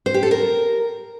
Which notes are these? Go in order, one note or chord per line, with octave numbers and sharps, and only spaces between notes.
C5
G4
A4
A#4